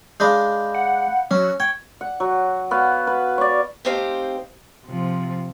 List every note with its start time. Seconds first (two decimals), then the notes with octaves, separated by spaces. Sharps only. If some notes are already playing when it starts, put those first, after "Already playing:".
0.20 G#3 D4 D#5 F5 B5 G6
0.75 F#5
1.31 F#3 C#4
1.60 G5 C#6 G#6
2.01 F#5
2.20 F#3
2.71 B3 F#4 F5
3.07 B4
3.38 C#5 D5
3.85 A3 C4 D#4 G4 C5 F5
4.87 C3 F3